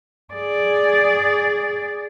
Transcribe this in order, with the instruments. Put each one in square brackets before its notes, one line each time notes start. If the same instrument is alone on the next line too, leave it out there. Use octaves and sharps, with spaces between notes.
[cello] G#4 D5